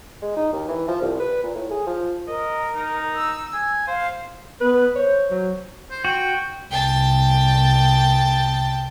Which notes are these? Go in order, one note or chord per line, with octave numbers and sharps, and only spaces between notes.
G#3
D#4
D#2
E3
F3
C2
B4
A#2
A2
G#4
F3
A#4 D#5
D#4
E6
G#5
C5 F5
B3 B4
C5 C#5
F#3
C5
F#4 G5
C2 G5 A5